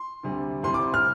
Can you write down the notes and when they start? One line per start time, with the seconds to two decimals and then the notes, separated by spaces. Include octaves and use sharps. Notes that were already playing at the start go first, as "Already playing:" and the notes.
Already playing: C6
0.23 D2 C3 G3
0.63 C2 C3 G3 C6
0.74 D6
0.94 F6